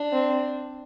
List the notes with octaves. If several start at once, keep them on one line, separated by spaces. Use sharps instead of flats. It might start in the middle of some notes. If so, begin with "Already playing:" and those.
Already playing: D4
C4